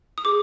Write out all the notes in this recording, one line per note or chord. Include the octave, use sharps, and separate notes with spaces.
D#6
G#4 D6